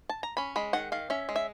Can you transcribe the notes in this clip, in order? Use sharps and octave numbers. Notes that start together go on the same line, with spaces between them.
A5
A#5
C#4 B5
G#3 B5
D#3 F#5
D#3 F5
C#4 E5
G#3
E5